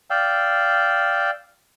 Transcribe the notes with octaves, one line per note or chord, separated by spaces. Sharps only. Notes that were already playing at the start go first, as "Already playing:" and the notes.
D5 F5 G5 E6